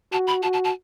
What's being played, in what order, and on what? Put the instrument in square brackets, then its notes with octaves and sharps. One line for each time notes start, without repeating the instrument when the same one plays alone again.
[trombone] F#4 [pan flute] A5
[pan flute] B5
[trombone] F#4 [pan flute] A5
[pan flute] A5
A5